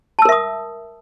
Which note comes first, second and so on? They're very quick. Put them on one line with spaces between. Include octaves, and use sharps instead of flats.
A5 E6 A#4 E5 D#6